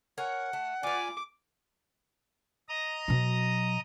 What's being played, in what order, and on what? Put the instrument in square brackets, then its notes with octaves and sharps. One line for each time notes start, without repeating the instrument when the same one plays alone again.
[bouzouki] A#4 C#5 G#5 [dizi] F#5
[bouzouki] A3
[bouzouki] F4 B4 [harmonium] D5 G#5 [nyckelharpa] D6
[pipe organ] D#5 A#5 D#6
[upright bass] B2 F#3